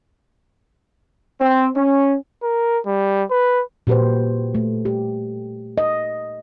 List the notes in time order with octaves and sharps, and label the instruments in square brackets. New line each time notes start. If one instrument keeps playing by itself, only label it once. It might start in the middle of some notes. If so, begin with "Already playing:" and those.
[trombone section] C4
C#4
[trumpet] A#4
G3
B4
[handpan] A#2 F#4 G4 B4 C5
A3
G4
D#5